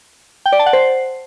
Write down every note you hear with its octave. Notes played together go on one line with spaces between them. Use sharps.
G5
D5
A5
F#5
C5